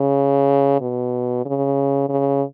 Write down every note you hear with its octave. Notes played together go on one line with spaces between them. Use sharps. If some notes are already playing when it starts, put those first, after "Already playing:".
Already playing: C#3
B2
C#3
C#3